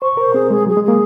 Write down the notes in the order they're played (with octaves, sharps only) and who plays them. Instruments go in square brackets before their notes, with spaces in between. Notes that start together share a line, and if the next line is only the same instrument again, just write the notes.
[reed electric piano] C5 [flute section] C#6
[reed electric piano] A#4 [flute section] C5
[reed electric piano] C4 [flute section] G#4
[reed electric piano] G#3 [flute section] G#4
[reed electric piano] F#3 [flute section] G#4
[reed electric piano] G#3
[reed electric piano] A#3 [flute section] G#4